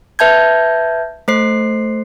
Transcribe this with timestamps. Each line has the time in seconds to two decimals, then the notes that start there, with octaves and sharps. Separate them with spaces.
0.19 B4 E5 A5 G6 G#6
1.28 A3 C5 C7